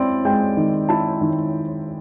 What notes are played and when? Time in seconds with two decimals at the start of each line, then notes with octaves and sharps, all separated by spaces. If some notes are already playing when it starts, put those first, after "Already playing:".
Already playing: C4 E4 D5
0.25 G#3 G5
0.57 D#3
0.89 E4 A5
1.21 D#3